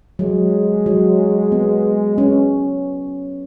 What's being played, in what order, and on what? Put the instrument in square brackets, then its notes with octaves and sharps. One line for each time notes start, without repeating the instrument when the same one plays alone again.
[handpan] F#3 [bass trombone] G#3
[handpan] F#3
B3
C#4